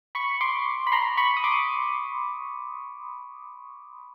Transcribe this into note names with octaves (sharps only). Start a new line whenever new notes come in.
B5 C#6
C6 D6
B5
A#5 C6
B5 C#6
D#6
C6 D6